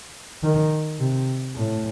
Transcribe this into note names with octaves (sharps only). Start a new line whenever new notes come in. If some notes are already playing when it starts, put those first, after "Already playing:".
D#3
C3
A2